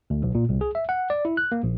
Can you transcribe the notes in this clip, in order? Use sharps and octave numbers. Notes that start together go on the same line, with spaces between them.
D2
B1
A#2
C2
G#4
E5
F#5
D5
E4
F#6
A#3
A#1